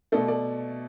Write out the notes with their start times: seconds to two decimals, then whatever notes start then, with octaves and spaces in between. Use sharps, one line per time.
0.12 B2 A3 A4 D5
0.28 A4 D5